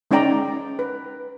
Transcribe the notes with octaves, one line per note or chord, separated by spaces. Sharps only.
G#3 C#4 D#4 D5 G5 A#5
B4